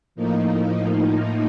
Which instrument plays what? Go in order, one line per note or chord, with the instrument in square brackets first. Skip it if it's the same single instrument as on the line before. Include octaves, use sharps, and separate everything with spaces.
[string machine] A2 F3 A#3 D#4